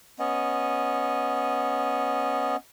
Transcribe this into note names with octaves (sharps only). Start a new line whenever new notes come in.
B3 C#4 D#5